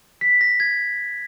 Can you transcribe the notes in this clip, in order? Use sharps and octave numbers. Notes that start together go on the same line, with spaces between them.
B6
A#6
G#6